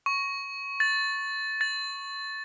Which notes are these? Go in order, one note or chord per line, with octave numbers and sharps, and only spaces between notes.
C#6
A6
A6